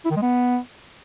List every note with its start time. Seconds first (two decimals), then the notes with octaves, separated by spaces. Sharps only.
0.05 E4
0.11 D#3
0.16 G#3
0.22 B3